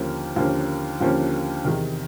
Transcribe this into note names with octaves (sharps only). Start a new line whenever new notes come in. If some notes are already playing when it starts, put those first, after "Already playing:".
Already playing: D#2 D3 F3 A#3 C#4
D#2 D3 F3 A#3 C#4
D#2 D3 F3 A#3 C#4
E2 C3 D#3